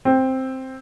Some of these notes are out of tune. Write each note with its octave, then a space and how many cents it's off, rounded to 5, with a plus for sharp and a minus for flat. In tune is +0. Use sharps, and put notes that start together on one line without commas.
C4 +5